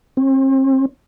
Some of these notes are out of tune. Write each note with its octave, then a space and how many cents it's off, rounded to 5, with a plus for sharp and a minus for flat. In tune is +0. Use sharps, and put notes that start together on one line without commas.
C4 +40